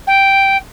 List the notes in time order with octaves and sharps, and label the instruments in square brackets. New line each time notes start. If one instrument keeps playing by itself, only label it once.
[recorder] G5